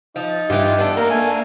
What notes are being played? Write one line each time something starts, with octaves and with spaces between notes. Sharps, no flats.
F3 D#4
G2 E3 F4 G4
B3 D4 A4
A#3 A#4
A3 G#5